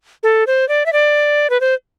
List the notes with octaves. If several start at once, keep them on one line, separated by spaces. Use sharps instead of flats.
A4
C5
D5
E5
D5
B4
C5